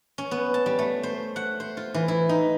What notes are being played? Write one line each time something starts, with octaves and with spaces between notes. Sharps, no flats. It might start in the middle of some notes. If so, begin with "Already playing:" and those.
C#4
B3
A5
G3
A3
C5
F#5
C5
F4
E3
E4
D#4